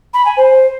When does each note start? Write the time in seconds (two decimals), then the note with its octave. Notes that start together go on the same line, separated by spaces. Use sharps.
0.14 B5
0.25 G#5
0.37 C5